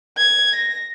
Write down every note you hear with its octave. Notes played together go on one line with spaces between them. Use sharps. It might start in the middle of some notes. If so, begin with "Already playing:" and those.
G#6
A#6